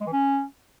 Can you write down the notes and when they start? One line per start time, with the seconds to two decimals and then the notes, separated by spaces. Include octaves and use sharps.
0.01 G#3
0.06 E3
0.12 C#4